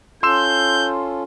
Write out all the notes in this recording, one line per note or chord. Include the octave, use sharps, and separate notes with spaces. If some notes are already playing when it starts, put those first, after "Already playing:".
C#4 F4 A4 C6 E6 G6 E7